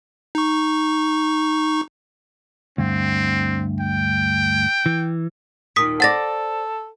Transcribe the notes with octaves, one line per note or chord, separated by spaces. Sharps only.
D#4 C#6
D2 G2 C4
G5
E3
D#2 A#2 D#6 B6
A4 C5 D5 F#5 A6 A#6